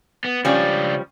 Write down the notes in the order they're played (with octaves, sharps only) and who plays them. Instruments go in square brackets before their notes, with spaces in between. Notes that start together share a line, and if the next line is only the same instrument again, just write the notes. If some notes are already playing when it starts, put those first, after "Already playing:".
[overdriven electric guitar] B3
[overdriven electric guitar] C#2 D4 [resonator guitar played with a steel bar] F3 G3 C#4